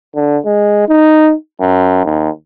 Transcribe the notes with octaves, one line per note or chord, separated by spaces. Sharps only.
D3
G#3
D#4
F#2
D#2